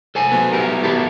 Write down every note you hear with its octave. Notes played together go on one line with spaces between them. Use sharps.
A4 C5 G#5
F#3 B3
E4 G4 A#4
E4 G4 A4